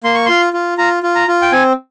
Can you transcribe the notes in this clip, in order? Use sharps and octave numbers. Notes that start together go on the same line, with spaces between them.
A#3 C6
C#6
F4 C6
F4
F4 A#5
F4
A#5
F4
G5
C4 G#5